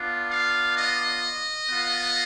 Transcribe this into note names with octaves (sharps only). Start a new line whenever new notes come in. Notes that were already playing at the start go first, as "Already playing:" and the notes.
Already playing: B3 D4 F4
F5
D#5
B3 F4